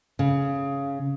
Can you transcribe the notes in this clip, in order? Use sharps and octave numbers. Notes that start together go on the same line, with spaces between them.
C#3